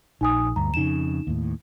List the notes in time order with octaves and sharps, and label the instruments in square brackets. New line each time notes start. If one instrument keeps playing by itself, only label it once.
[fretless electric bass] A#1 [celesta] D#4 G#5 D#6
[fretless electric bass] D2 G2 [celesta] A#5
[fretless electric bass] F2 C#3 [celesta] D#4 E7
[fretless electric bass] D#2 A2